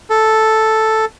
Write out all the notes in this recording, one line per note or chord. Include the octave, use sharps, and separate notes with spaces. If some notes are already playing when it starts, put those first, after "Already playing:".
A4